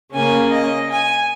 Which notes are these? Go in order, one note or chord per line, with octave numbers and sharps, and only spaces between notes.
C#3 A#3 C#4 G#5
D#5
G#5